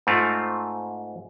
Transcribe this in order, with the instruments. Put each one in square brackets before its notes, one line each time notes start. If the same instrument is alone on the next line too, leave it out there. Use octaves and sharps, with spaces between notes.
[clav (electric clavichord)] G#2 A3 C4 F4